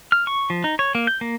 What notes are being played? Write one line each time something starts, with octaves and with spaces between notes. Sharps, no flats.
F6
C#6
F3
D#4
C#5
A#3
G6
A#3